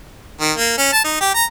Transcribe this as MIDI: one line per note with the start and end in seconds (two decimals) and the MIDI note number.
0.40 0.52 51
0.58 0.74 58
0.78 0.90 61
0.93 1.01 81
1.04 1.16 63
1.21 1.31 67
1.35 1.45 82